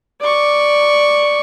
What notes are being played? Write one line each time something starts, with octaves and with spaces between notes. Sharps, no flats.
D5 C#6